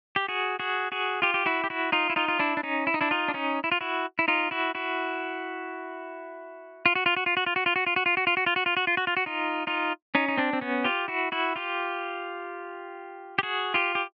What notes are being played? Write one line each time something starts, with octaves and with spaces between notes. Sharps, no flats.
G4
F#4 G#4
F#4 G#4
F#4 G#4
F4 G4
G4
E4 F#4
G4
E4 F#4
D#4 F4
E4
D#4 F4
F4
D4 E4
D4
C#4 D#4
E4
D#4
D4 E4
D#4 F4
D4
C#4 D#4
E4
F4
E4 F#4
E4
D#4 F4
E4 F#4
E4 F#4
F4
F#4
F4
F#4
F4
F#4
F4
F#4
F4
F#4
F4
F#4
F4
F#4
F4
F#4
F4
F#4
F4
F#4
F4
F#4
F4
F#4
D#4 F4
D#4 F4
C#4 D#4
D#4
C4 D4
C4
B3 C#4
F4 G4
E4 F#4
E4 F#4
F4 G4
G4
F#4 G#4
F4 G4
G4